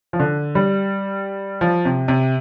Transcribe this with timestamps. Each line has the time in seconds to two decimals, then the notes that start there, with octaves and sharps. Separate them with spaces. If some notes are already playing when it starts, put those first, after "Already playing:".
0.13 F3
0.20 D3
0.55 G3
1.61 F3
1.85 C3
2.08 C3